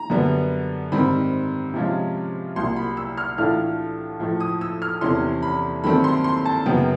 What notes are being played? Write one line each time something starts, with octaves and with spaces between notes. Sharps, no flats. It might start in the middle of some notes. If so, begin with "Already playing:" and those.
Already playing: A#5
F#2 D3 G3 B3
G#2 D#3 G3 C4 B5
C3 F3 G#3 C#4 F4
C2 A#2 F#3 C6
B5
E6
F6
A2 E3 A3 D4 F4 F6
A2 F3 A3
D#6
E6
F6
E2 C3 E3 A3 C#4 C6
B5
G2 D#3 F#3 A3 C4 B5
C6
C6
A5
F#2 C#3 F#3 B3 G5